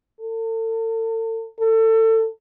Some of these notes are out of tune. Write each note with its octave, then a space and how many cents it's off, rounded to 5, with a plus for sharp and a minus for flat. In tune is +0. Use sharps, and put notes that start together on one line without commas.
A4 +40
A4 +25